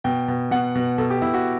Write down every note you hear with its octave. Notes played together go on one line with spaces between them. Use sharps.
B2 G5
B2
B2 F#5
B2
B2 A4
G4
B2 E4
F#4